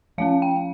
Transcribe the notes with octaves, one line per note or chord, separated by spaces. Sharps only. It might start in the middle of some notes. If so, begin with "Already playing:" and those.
F3 A3 C#4 F5
G5